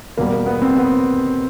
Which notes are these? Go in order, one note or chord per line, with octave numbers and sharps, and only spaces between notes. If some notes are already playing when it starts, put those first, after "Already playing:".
E2 B2 G3 A#3
A#3
B3
C4
B3